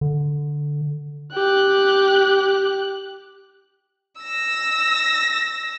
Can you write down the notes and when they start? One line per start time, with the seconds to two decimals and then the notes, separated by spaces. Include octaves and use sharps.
0.01 D3
1.34 G4 F#6
4.21 E6 A#6